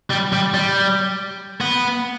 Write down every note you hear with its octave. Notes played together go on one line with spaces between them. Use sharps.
G3
G3
G3
B3